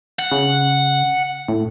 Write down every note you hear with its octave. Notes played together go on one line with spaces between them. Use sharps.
F#5
C#3
A2